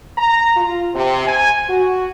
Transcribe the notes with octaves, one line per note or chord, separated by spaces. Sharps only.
A#5
F4
C3
G#5
F#4